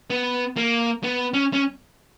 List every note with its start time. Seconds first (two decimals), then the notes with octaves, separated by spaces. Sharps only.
0.10 B3
0.57 A#3
1.04 B3
1.34 C#4
1.53 C#4